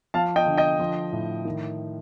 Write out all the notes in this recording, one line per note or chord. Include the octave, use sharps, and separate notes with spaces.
F3 F5 A5
D#5 G5
D3
D#5 G5
F3
A2
D#3